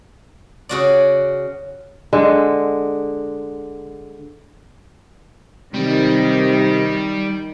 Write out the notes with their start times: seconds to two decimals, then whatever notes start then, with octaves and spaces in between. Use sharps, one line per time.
0.69 C#3 F#4 D5
2.13 D3 G#3
5.74 C3 D#3 G3